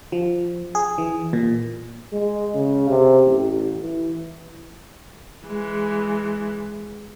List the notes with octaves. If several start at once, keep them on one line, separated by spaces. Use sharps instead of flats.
F3
G#4
E3
A#2
G#3
C#3
C3
A1
E3
E3 G#3